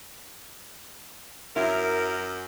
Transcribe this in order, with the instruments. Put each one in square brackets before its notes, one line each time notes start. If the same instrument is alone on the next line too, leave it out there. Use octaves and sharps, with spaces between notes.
[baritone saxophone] F#2 [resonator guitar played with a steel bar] F#3 E4 [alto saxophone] A#4